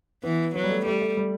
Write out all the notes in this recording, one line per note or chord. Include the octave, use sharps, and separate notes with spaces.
E3 B3
F#3 B3
G3
A3
G3 A3
A3
G3